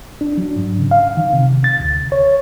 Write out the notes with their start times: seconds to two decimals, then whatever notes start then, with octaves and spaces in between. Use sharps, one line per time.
0.21 D4
0.38 F#3
0.56 G#2
0.79 C#3
0.91 F5
1.17 D#3
1.33 C3
1.64 A6
1.80 D2
2.12 C#5